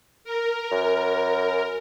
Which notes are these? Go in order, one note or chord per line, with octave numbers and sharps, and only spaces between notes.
A#4
F#2